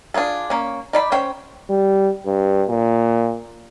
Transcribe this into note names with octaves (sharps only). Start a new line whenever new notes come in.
D4 F4 G#4 A4
A#3 C#4
D#4 D5 B5
C#4 C5 G5
G3
G2
A#2